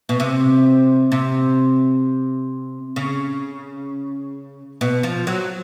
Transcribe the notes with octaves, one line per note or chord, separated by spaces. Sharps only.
B2
C3
C3
C#3
B2
F3
F#3